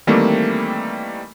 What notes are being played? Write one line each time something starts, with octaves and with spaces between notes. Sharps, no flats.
D#3 E3 G3 A3 A#3 C4